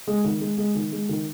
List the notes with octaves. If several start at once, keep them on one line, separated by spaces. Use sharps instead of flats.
G#3
D#3
G#3
G#3
D#3
G#3
D#3